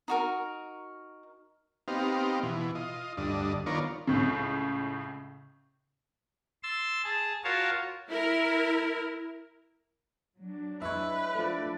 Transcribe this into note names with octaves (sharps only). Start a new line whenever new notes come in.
D#4 F#4 A#4
B3 C4 D#4 G4 F5
B2 E3
F4 D#5
D2 G2 D4 D#5
D#3 B3 F4 A#4 C#5 D5
C#2 A2 C#3
C6 E6 A6
G#4 A5
F4 F#4 A#4 C#5 F5 A5
E4 A#4
F#3 D4
G#3 E4 B4 C#5 E5
F3 A3 D4 A4 D5